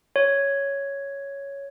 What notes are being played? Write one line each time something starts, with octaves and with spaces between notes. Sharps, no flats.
C#5